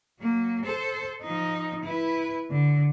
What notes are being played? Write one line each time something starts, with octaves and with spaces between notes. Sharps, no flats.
F#3 A#3
A4 C5
F3 D#4
E4 B4
D3